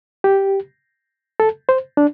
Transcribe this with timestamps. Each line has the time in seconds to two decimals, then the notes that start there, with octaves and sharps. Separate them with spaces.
0.24 G4
1.40 A4
1.69 C5
1.97 D4